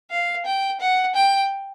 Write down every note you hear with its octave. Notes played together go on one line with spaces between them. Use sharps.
F5
G5
F#5
G5